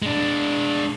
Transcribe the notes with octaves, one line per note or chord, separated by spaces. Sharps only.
G#3 D4